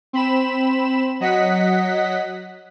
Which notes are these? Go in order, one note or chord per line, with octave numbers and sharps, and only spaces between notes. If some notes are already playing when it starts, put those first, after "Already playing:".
C4 B5 E7
F#3 D#5 F#5 B6